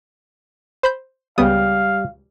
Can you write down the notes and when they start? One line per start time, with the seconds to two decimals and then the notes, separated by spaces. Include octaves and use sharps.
0.83 C5 B5 G6
1.38 C#2 G3 B3 F5 G5 D#6